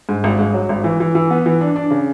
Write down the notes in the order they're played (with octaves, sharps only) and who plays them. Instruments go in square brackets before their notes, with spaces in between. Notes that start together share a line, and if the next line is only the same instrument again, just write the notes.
[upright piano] G#2
G#1
G#2
F#3
G#1
E3
E3
E3
B3
E3
D4
D4
C#3